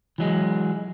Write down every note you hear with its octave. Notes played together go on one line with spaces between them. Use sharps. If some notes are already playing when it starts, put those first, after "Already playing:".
E3 F#3 G#3